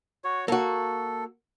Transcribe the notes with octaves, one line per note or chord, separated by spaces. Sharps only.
F#4 C#5
A#3 F#4 A4